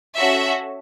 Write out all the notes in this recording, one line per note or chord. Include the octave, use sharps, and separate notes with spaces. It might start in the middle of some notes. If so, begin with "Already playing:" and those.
C#4 F#4 A4 E5